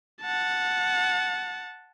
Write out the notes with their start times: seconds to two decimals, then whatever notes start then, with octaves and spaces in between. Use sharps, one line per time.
0.22 F#5 A5